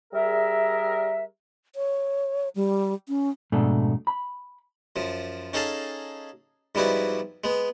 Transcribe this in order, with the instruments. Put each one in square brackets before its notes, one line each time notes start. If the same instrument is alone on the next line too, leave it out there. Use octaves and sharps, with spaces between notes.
[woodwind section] G3 G#4 A#4 E5
[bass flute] C#5
G3
C#4
[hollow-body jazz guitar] F2 G#2 B2 A3 D4
B5
[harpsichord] F#2 F3
C#4 D#4 G#4 A4 F5 A5
G#2 F3 G3 B3 E4 F#4
G#3 B3